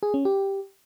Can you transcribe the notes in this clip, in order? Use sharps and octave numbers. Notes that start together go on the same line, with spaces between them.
G#4
C#4
G4